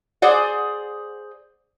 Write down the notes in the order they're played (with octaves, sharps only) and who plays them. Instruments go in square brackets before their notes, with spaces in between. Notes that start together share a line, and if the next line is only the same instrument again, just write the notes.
[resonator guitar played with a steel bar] G#4 C5 D5 F#5